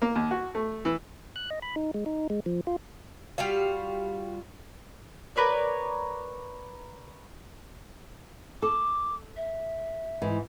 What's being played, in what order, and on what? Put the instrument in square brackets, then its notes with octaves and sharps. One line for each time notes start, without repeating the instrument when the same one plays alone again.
[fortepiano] A#3
D#2
F#4
A3
E3
[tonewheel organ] F#6
D#5
B5
D#4
G#3
D#4
G#3
F3
F4
[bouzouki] G3 F4 F#4 F5
[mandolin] A#4 B4 C#5 D5
[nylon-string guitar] A4 [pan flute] D6
[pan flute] E5
[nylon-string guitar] G#2 E3